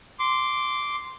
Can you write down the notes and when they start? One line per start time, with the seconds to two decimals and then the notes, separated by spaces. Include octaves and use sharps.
0.19 C6 D6